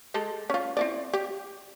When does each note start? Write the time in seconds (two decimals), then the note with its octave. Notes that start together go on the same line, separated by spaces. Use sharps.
0.14 G#3 G4 A4
0.50 C#4 F4
0.77 C4 E4 D5
1.14 G4